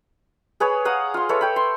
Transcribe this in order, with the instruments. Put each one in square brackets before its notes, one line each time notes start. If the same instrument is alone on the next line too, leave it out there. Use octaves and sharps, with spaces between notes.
[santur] G#4 B4 C#5 G#5
F5 F#5 A#5 D#6
F4 C6
A4 B4 C#5 E5
E5 G5 B5
C6